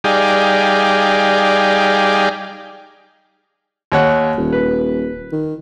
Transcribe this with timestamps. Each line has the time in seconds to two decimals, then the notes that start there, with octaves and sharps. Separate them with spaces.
0.04 G3 D#4 G#4 D5 F5 G5
3.92 D#2 C#5 F#5
4.37 D#1
4.53 B4
5.32 D#3